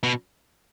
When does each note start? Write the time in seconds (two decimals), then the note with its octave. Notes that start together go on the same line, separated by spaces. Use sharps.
0.03 B2